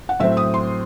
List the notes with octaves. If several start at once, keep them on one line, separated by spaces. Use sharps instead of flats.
F#5
A2 F#3 C4 E5
D#6
C6